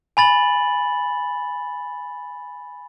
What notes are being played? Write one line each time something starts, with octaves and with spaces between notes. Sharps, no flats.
G#5 B5 A6 F#7